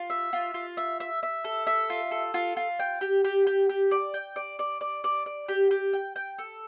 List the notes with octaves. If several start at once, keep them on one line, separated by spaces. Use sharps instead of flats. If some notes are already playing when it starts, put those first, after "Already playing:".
Already playing: F4
E5
F4
F4
E5
E5
E5
A4
E5
F4
A4
F4
F4
G5
G4
G4
G4
G4
D5
G5
D5
D5
D5
D5
D5
G4
G4
G5
G5
A4